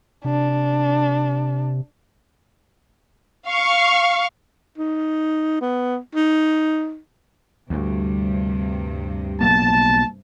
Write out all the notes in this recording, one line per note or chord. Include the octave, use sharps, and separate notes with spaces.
C3 D4
F5 C#6
D#4
B3
D#4
D2 G2 C3
B1 A#3 A5